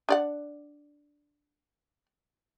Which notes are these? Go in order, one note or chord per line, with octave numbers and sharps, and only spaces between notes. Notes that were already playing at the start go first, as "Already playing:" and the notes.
D4 D5 F#5